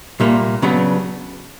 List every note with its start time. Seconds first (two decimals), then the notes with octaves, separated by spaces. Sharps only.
0.20 C2 A#2 G3 A#3
0.62 C#3 F#3 B3 D4